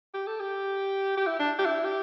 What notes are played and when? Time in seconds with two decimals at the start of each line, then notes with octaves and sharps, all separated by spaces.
0.14 G4
0.27 A4
0.40 G4
1.17 G4
1.27 E4
1.39 D4
1.59 G4
1.65 E4
1.85 G4